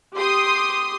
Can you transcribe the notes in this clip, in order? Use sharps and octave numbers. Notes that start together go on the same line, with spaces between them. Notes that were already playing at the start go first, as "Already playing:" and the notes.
G4 C6 D#6